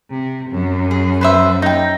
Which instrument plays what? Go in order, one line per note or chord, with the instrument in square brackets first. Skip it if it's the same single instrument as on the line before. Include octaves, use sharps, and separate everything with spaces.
[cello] C3
F#2
[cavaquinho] G#4
B4 C5 E5
D#4 G5